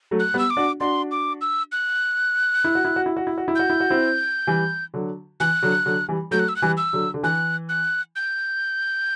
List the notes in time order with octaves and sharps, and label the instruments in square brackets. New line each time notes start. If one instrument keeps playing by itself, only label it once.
[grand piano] F#3 A3
[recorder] F#6
[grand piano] G3 B3
[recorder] E6
D6
[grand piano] D4 F#4
[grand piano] D4 F#4 [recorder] C6
[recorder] D6
E6
F#6
[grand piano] E4
F#4
E4
F#4
E4
F#4
E4
F#4
E4
[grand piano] F#4 [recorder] G6
[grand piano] E4
F#4
C4 E4
E3 G3
D3 F#3
[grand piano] E3 [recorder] F#6
[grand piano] D3 F#3
D3 F#3
E3 G3
[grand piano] F#3 A3 [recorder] G6
[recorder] F#6
E6
F#6
[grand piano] E3 G3
[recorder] E6
[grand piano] D3 F#3
D3
[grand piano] E3 [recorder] F#6
[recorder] F#6
G6